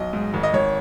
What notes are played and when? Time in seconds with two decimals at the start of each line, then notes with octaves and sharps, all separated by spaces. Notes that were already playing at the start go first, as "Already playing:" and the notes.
Already playing: B1 D#5
0.13 G#2
0.33 G#1
0.43 D#5
0.53 G#1 C#5